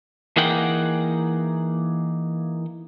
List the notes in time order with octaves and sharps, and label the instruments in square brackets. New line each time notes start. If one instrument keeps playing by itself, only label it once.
[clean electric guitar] E3 A#3 D#4 G#4 F#5 G5